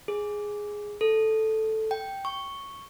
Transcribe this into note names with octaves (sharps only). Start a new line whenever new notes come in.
G#4
A4
G5
C#6